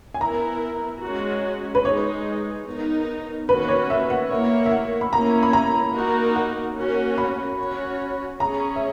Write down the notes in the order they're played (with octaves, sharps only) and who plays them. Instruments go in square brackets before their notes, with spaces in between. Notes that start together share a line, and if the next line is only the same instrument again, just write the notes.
[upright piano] G#5
[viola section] B3 E4 A#4 [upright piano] A#5
[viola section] G#3 C#4 F#4
[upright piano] B4
[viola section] G#3 D#4 G#4 [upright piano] C#5
[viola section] B3 D#4 A#4
[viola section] D#3 A#3 C#4 F#4 [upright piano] B4
[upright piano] C#5
E5
F#5
[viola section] A#3 E4 A#4 C#5 [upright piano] E5
[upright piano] E5
F#5
B5
[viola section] A#3 C#4 E4 [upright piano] A#5
[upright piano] B5
A#5
[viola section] A#3 D#4 F#4 A#4
[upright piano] F#5
[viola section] A#3 C#4 F#4 A#4
[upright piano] B5
[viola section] C#4 F#4 C#5
[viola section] C#4 G#4 C#5 [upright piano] A#5
[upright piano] E5